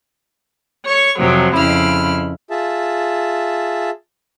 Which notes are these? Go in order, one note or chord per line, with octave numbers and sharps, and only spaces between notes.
C#5 C#6
F2 C3 F3 F#3
F2 C#3 E4 B5 F6
F4 G#4 E5 A5